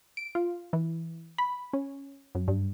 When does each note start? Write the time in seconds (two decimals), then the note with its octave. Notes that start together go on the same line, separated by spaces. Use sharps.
0.17 D7
0.35 F4
0.73 E3
1.38 B5
1.73 C#4
2.35 F#2
2.48 G2